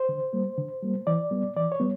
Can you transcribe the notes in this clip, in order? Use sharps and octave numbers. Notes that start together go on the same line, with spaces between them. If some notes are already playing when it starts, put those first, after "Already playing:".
Already playing: C5
D3
G3 A#3
D3
G3 A#3
E3 D5
G3 B3
E3 D5
C#5
G3 B3